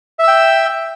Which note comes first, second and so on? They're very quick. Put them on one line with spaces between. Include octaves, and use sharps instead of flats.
E5 E6 G5